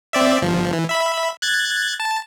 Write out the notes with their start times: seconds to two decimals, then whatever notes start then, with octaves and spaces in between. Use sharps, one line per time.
0.13 C4 D5 E5
0.41 G1 F3
0.73 E3
0.89 E5 B5
1.42 F#6 G#6 A6
2.00 A5